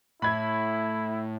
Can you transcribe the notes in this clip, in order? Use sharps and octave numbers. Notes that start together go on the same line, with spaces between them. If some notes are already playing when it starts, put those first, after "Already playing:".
A2 E4 B5 G#6